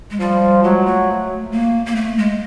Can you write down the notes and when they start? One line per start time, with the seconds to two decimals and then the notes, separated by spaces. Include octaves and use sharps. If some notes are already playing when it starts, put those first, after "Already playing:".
0.11 G#3
0.20 F3 G3
0.63 F#3 G#3
0.86 A3
1.52 A#3
1.86 A#3
1.96 A3
2.18 G#3